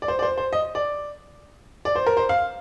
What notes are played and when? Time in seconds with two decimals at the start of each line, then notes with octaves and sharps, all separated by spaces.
0.02 D5
0.08 C5
0.19 D5
0.22 C5
0.38 C5
0.53 D#5
0.75 D5
1.85 D5
1.96 C5
2.07 A#4
2.17 C5
2.29 F5